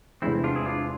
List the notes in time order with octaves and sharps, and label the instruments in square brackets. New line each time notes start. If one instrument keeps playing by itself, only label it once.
[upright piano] E1 E2 C3 [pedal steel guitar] C4 E4
[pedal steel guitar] D4 F4
E4 G#4
D4 F4